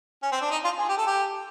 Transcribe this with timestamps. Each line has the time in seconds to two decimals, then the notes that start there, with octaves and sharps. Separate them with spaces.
0.23 C#4
0.32 C4
0.41 D4
0.51 D#4
0.64 F4
0.78 G#4
0.88 G4
0.97 A4
1.07 G4